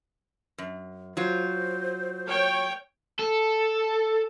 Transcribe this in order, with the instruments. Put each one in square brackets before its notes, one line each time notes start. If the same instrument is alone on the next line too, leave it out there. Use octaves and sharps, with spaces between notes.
[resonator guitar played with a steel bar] F#2
[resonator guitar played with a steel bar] F#3 F4 [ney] C5
[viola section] C#5 G5
[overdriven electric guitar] A4